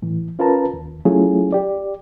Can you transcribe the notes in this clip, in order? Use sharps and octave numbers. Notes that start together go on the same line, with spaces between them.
A2 E3
C#4 F4 A#4 B4 A5 A#5
D#2
F#3 A3 C#4 E4 F4 G#4
G4 D5